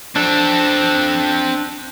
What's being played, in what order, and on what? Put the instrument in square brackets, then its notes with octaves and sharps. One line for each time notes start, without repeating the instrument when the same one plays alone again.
[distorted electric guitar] C4 A4 [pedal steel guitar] D4